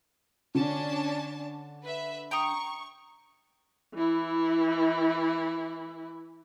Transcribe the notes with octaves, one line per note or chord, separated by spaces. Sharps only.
D3 C#4 D4 A5
B4 E5
G5 A#5 C#6 D#6
E3 E4